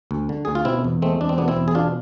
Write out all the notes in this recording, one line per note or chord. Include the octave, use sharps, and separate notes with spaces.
D2
D3
D2 G#4
F4
B2 C4 E4
E2
G#3 A3 C4
E2 D4
C4
B2 B3 D4
C4 E4
E2
G#4
B2 D4 F4